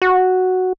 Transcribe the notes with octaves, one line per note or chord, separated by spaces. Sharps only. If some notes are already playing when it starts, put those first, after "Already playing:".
F#4